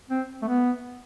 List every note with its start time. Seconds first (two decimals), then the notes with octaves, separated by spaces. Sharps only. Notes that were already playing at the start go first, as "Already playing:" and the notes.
0.10 C4
0.42 A3
0.48 B3